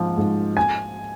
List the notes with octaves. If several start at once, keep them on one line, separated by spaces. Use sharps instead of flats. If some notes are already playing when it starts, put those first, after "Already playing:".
Already playing: G#2 F3
G#2
G#5